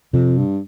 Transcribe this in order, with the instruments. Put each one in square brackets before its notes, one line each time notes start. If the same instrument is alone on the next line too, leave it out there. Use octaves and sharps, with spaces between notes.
[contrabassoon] F2 [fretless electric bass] C3
[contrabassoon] G2